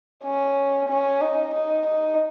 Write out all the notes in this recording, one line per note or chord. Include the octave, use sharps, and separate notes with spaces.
C#4
C#4
D#4
D#4
D#4